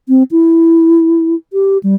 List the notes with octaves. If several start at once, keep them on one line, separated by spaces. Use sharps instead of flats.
C4
E4
G4
G3